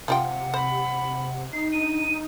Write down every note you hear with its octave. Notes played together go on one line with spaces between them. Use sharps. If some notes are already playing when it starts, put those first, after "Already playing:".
C3 F3 F4 F#5 G5
C5 B5
D#4 C7
D4 D#7